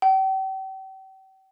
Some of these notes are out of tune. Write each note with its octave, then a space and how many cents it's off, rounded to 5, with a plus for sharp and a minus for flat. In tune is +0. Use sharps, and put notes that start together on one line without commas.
G5 -40